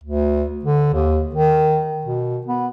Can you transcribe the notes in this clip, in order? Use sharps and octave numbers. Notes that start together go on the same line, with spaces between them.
D2
D3
D#2
D#3
B2
B3